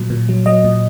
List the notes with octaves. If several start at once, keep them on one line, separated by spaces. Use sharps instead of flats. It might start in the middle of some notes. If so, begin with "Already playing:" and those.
Already playing: A#2 F#3
A#2
F#3
F#3 D#5
A#2